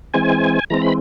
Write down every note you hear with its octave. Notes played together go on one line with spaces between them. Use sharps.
E3 G#3 C4 G#5
E3 G#3 C4 A#5
B5